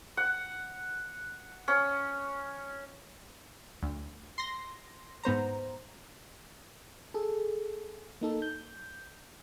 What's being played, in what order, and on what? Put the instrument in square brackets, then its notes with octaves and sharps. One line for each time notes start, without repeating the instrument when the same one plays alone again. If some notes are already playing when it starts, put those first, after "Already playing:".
[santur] F#5
C#4
[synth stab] D2
C6 A#6
G#2 B3 C5 A#5
[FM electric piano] G#4 A4
A#3 D#4 A4
G6